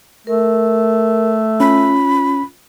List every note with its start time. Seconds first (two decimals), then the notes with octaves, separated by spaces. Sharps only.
0.27 A3 A#4
1.60 C#4 F4 B5